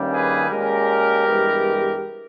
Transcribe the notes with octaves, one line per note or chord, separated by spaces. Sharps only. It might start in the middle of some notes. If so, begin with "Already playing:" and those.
Already playing: G2 D#3 G3 A#3 C#4
G#4 B4
A#2 G#3 C#4 G4 A#4
G2 E3 G#3 B3